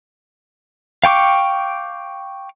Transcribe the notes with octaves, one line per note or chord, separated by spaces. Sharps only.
F5 G5 C#6 D6